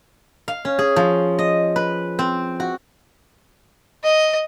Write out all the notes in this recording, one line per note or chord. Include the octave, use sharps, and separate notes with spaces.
F5
C#4
G#4
F3
D#5
B4
C4
F#4
D#5